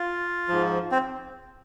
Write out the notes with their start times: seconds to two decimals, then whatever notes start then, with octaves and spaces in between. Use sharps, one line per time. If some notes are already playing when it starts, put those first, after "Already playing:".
Already playing: F4
0.48 G#2 F3
0.92 C4